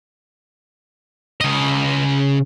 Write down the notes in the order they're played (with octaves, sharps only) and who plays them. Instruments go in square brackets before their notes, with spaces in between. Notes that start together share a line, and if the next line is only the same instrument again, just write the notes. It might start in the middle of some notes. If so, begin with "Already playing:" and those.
[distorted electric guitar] C#3 D#5